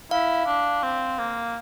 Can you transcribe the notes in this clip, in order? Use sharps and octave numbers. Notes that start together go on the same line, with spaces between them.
E4 F5
D4
C4
A#3